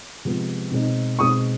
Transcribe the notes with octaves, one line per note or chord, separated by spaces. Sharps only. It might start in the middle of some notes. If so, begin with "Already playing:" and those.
C3 F3 G#3 B3
B2 G#3 C4 D#4
B2 G#3 C4 D#4 C#6 D#6